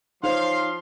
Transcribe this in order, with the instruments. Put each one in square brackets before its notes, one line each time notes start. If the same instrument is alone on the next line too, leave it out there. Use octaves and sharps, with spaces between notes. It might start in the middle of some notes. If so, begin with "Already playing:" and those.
[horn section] F3 C6 [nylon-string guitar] D#4 C5 C#5 [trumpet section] F5